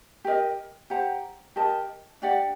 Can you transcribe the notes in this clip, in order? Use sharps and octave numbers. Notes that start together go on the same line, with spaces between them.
G4 A#4 D#5
G4 C5 F#5 A#5
G4 A#4 D#5 A5
D4 G4 D5 F#5